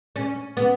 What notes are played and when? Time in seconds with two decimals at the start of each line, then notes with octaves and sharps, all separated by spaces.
0.16 C#4
0.57 B3